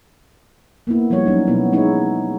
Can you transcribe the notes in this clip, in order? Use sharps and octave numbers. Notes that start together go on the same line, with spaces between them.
A#3 B3 E4
F3 G3 E4 C#5
F#3 C#4 D#4
B2 F#3 B3 E4
G#3 D#4 E4 C#5